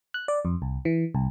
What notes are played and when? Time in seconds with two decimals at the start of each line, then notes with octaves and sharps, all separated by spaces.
0.14 F#6
0.28 D5
0.45 F2
0.62 C2
0.85 E3
1.15 C2